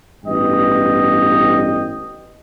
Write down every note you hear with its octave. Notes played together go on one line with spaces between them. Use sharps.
A1 G2 B3 D#5 G5